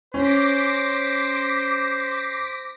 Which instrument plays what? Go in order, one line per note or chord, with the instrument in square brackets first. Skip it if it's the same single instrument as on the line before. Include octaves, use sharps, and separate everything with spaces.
[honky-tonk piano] C#4 [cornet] C5 [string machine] D6 A#6 B6